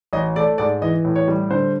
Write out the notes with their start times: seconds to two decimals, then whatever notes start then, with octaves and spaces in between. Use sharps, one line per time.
0.13 A1 D#5
0.36 A3 D5
0.58 G#2 D5
0.82 E3 D#5
1.04 A2
1.16 C#5
1.28 G3
1.50 D3 C5